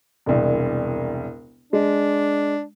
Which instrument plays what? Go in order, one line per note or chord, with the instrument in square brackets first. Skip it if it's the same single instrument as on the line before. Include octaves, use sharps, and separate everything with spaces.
[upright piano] E1 C2
[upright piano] G#3 [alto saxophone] D4